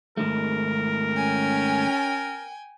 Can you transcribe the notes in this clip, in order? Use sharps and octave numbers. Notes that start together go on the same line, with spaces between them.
G#2 D#3 A3 A#4
C#4 G5 G#5